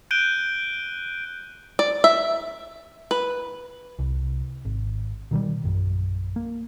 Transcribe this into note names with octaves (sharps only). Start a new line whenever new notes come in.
F#6 G6 D7 D#7 G7
D5
E5
B4
C2
G#1
B2 D#3 F#3 G3
A#1 F#2
A#3